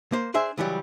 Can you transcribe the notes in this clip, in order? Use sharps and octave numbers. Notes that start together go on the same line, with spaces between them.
A#3 C5
D4 G#4 C5 E5
C#2 E3 F#3 G3